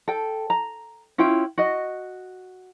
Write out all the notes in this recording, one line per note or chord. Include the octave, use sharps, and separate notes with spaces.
A4 G5
A#5
C#4 E4 F4 G5
F#4 D#5